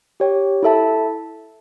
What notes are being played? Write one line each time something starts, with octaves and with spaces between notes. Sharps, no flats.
G4 C#5 G5
E4 A4 E5 A5